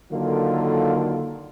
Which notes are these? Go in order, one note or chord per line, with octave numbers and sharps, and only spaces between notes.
D3 D#3 F#3 A#3 F4 A4